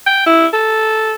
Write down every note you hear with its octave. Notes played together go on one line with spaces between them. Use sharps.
G5
E4
A4